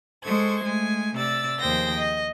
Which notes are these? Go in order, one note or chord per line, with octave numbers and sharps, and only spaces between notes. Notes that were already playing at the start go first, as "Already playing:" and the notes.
G#3 A4 C5 C#6 G#6
G#3 A3 G#5
C3 D5 E6 A6
D#2 F3 G#4 C5 G5 A#6
D#5